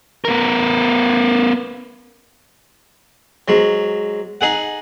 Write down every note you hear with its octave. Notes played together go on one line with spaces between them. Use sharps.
B3 A#4
G#2 F#3
D#4 G#4 F#5